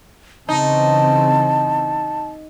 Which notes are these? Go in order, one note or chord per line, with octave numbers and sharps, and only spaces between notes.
C#3 E3 C4 D#4 A5